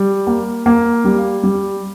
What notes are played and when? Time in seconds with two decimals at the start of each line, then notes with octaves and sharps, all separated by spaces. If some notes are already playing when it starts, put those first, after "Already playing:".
Already playing: G3
0.27 A#3
0.66 A#3
1.05 G3
1.43 G3